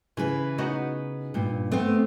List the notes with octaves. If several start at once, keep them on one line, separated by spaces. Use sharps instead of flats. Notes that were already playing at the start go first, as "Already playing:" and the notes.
C#3 E3 G#4 B4
B3 D#4 F#4
G2 A#2
A3 B3 C4